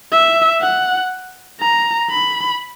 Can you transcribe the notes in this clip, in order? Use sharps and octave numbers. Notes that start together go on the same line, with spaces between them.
E5
F#5
A#5
B5